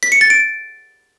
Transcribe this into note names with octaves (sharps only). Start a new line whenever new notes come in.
B6
C#7
A6
D7